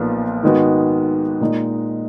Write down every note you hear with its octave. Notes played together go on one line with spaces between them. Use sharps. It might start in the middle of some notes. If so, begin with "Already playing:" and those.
Already playing: B1 A#2 F3 B3
G#2 D#3 G#3 B3 F#4
A#2 G#3 D#4